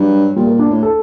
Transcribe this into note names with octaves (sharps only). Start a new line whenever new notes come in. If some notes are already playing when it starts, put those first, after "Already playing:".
Already playing: G2 F#3
A#2 G3
A#3
D4
A2
A4